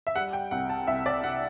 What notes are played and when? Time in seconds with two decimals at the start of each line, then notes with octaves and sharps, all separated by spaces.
0.07 E5
0.16 G3 F#5
0.33 G5
0.51 C2 F#5
0.69 A5
0.87 C2 E5
1.06 D5
1.23 C3 F#5